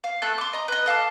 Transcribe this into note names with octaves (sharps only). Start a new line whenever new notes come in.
F5
A3 A4 E5 F#6
C6 D6
D#5 A#5
B4 D#5
A4 F5 A5 D6